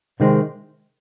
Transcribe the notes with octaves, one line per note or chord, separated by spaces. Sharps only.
C3 D#3 G#3 C4